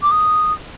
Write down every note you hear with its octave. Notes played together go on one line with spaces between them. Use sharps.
D6
D#6